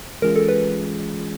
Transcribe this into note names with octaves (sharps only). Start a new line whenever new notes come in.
E3 G#3 C#4 F4 G#4 A#4
A4
B4